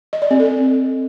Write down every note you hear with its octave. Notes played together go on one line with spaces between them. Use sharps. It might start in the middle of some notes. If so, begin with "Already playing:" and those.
D#5
D5
C4
A4